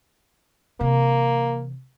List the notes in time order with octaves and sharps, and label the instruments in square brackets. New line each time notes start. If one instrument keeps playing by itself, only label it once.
[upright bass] C3 E3 [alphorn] A#3